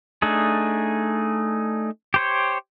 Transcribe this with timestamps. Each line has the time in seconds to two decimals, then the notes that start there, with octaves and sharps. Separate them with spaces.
0.22 A3 D4 D#4 G#4
2.14 G4 C5 C#5